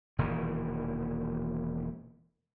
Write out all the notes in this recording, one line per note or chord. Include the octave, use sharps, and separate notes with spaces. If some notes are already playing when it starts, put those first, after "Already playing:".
E1 A#2 D#3 E3